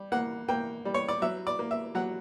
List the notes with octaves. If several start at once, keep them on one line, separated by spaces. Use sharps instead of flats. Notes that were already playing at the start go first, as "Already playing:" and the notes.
Already playing: G3
A#3 F#5
A#3 G5
G3
C#5
D5
F#3 E5
D5
A#3
E5
F#3 F#5